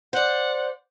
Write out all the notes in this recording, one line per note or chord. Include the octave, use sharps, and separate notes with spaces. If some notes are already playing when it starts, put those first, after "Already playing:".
C5 D5 F#5